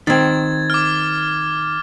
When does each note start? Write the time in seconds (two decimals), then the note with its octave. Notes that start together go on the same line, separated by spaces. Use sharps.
0.07 D#3 C4 G#6 A6
0.70 D6 F6